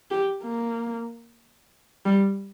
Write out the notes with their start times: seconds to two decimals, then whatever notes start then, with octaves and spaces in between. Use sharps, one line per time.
0.11 G4
0.43 A#3
2.06 G3